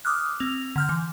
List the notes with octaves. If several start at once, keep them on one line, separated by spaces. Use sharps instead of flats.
D6 D#6 F6 F#6
C4 F7
D3 F6 G6
E3